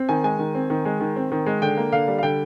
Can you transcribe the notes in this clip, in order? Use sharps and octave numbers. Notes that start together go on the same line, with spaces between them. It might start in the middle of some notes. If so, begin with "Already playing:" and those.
Already playing: C4
D#3 G#5
G#3 G#5
D#3
C4
D#3
G#3
D#3
C4
D#3
G#3
D3 G5
A#3
D3 F5
G3
F5
D3 G5